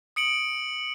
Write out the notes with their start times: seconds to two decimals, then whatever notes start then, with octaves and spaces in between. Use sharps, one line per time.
0.16 D#6 C#7 D7 F#7